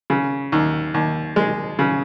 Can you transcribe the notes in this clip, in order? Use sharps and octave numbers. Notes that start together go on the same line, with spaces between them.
C#3
D#2
D#2
G#3
C#3